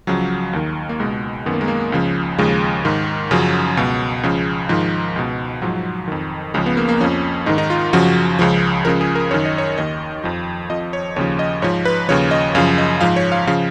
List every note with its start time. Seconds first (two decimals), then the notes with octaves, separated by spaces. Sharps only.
0.07 C#2 C#3 F3 F#3
0.53 D#2 D#3
0.89 A#3
1.00 C#2 B2 G#3
1.46 F#2 D#3 B3
1.53 A#3
1.61 G#3
1.68 A#3
1.92 C#2 C#3 F3
2.38 D#2 C#3 F3 G#3
2.85 G#2 D#3
3.31 F#2 C#3 F3 F#3
3.77 C#2 B2
4.23 C#2 C#3 F3
4.69 G#2 D#3 F3
5.16 C#2 B2
5.62 G#2 F3 F#3
6.08 F2 D#3
6.54 C#2 C#3 F3 G#3
6.66 B3
6.77 A#3
6.89 A#3
7.01 F2 F3 C#4
7.46 G#2 D#3 D#4
7.58 D#4
7.70 F4
7.93 F#2 C#3 F3 F#4
8.39 C#2 C#3 F3
8.85 C#2 C#3 F3 A#4
9.01 G#4
9.15 A#4
9.31 F#2 D#3 C#5
9.45 D#5
9.58 C#5
9.78 D#2 D#3 D#5
10.24 F2 F3
10.70 F2 F3 D#5
10.93 C#5
11.16 D#2 C#3 F3 C#5
11.39 D#5
11.62 G#2 F3 C#5
11.85 B4
12.09 D#2 C#3 F3 C#5
12.31 D#5
12.55 F#2 C#3 F3 F5
12.78 D#5
13.01 G#2 F3 F5
13.16 C#5
13.32 F5
13.47 C#3 F3 F5